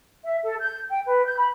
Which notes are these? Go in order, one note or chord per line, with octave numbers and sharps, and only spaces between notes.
E5
A4
G6
G5
B4
G6
B5